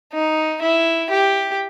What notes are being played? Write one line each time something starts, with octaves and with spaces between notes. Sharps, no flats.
D#4
E4
G4